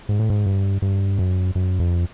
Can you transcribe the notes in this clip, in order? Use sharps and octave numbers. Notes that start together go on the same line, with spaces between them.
G#2
A2
G#2
G2
G2
F#2
F#2
F2